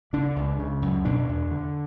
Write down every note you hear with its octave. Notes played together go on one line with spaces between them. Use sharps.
C#3 D4
C#2
C#3
F#2
B2 D4
E2
D3